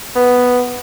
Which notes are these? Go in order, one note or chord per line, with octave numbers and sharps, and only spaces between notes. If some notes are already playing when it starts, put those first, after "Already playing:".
B3